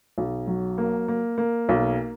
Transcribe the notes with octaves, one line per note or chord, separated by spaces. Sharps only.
B1
F#3
A#3
A#3
A#3
B1